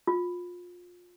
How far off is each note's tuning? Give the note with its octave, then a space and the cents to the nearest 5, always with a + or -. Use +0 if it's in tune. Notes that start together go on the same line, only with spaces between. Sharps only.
F4 +25